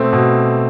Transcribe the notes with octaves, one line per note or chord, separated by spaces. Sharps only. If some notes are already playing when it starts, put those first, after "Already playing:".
Already playing: B2 A3 C4
B2